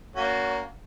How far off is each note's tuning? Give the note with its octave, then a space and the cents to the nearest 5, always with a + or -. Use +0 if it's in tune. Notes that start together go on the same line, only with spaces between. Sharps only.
A#3 +0 C#4 +40 F#4 +0